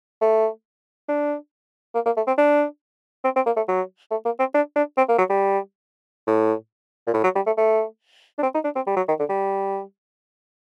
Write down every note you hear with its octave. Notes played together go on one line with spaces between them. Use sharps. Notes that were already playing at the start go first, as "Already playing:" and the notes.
A3
D4
A#3
A#3
A3
C4
D4
C4
C4
A#3
A3
F#3
A3
A#3
C4
D4
D4
C4
A#3
F#3
G3
A2
A#2
A2
F#3
G3
A3
A3
D4
C4
D#4
D4
C4
G3
F#3
D#3
D3
G3